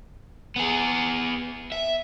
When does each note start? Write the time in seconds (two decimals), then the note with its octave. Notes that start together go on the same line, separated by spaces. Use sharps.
0.56 B3 G#4
1.72 E5